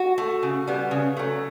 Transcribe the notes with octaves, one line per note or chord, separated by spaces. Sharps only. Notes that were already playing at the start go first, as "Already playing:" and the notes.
Already playing: F#4
A3
C#3
G3 B3
C#3
F#3 A3